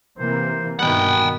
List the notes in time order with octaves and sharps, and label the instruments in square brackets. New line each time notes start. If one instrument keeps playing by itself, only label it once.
[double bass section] C3 E3 A#3 [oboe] C5
[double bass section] G2 B2 D#3 [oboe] B3 [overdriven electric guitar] F#5 G5